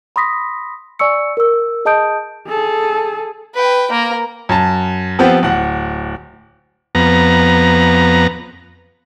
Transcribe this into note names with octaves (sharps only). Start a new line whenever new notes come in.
B5 C6 D#6 A#6 B6
D5 G#5 C#6 E6 C#7
A#4 E6
G#4 D#5 A5 D#6 G6 D7
G#4 A4
B4 G5
A#3 A#4
F#2 A5
F3 B3 C4 G4
D1 F#5
F2 B3 A#5